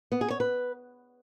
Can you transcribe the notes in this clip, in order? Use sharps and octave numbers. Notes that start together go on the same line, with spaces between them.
B3
G#4
C#5
B4